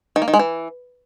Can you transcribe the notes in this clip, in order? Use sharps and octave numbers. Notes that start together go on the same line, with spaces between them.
D#3
A#3
D#3
G#3
E3